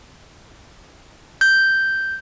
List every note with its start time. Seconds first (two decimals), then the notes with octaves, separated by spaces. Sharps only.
1.41 G6